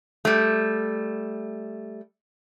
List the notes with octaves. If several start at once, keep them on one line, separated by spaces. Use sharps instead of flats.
G3 A3